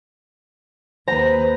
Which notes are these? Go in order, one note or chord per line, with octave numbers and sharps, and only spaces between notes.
D#2 B4 C5 A#5